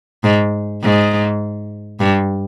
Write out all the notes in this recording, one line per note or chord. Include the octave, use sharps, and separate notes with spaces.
G#2
G#2
G2